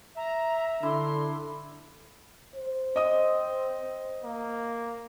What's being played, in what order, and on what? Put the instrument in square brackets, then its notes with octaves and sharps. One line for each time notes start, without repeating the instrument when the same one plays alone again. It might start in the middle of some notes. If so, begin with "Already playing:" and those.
[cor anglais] E5 [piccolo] A#5
[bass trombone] D3 [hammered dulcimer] D4 E4 [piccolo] C6
[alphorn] C5
[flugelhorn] C4 [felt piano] D#5 D#6
[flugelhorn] A#3